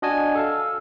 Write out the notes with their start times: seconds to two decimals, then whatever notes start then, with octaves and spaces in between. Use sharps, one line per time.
0.02 D4 F#4 D#5 F#5 G#5 A5
0.35 A4 F5 A5